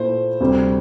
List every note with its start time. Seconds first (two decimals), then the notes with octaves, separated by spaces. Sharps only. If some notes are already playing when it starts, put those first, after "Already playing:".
Already playing: A#2 A3 E4 C5
0.41 D2 C3 G3 C4